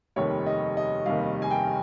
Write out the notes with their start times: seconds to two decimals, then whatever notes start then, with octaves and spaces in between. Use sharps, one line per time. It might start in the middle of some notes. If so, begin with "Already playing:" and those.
0.16 F1 D#2 D#3 G3 C#5
0.46 D#5
0.77 D#5
1.06 F1 D#2 D#3 G3 F5
1.42 G#5
1.51 G5